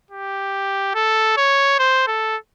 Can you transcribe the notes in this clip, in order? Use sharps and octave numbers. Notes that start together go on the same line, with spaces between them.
G4
A4
C#5
C5
A4